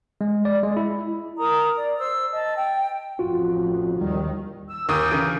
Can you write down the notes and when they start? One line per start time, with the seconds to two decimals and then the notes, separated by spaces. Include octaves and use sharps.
0.21 G#3
0.45 D5
0.63 G#3
0.77 E4
1.37 A#4 A#5 D#6
1.76 D5
1.98 C5 E6
2.32 D#5 A5
2.55 G5
3.19 A1 F2 F4 F#4
4.01 D#2 D#3 G3
4.69 E6
4.89 D#2 G4 G#4 A#4 D#6 D#7
5.11 C#3 E3 D7